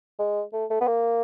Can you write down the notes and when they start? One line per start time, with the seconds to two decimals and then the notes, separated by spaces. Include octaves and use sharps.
0.19 G#3
0.53 A3
0.70 A3
0.81 B3
0.87 A#3